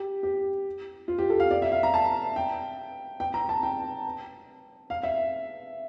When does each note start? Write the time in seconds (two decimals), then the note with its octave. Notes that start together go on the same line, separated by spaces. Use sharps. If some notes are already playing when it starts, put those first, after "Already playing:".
Already playing: G4
0.23 G4
1.08 F4
1.18 G4
1.30 A4
1.40 F5
1.51 D5
1.62 E5
1.72 F5
1.83 A#5
1.94 A5
2.36 G5
3.20 G5
3.34 A#5
3.49 A5
3.63 G5
4.90 F5
5.03 E5